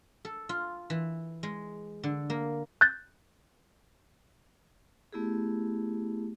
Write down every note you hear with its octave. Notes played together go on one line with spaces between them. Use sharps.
A4
F4
E3
G#3
D3
A#3
F#6 G6 A6
A3 B3 E4 G4 G#4